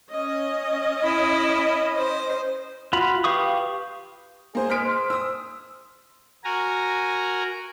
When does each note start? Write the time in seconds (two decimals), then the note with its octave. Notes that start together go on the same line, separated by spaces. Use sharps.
0.12 C#4 D#5
1.03 E4
1.99 C5
2.93 F4 F#4 B5
3.24 G4 B4 F5 C#6 D#6
4.55 A#3 G#4 C5
4.70 G#3 F6 B6 D7
4.84 C5
5.10 D#6 E6
6.44 F#4 A#4 G#5 A#5